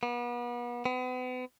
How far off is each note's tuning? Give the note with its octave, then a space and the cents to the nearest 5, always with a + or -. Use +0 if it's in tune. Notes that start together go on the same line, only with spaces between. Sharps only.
B3 -35
B3 +40